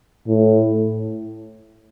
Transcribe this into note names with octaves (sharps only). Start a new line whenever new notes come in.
A2